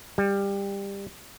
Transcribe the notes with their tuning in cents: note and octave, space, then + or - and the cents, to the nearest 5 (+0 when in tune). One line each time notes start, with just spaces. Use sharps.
G3 +20